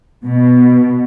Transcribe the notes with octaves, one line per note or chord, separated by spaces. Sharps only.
B2